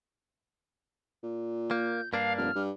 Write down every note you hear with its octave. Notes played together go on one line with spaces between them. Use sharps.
A#2
A#3 G6
G2 A#3 D4 F5
F1 F6
G2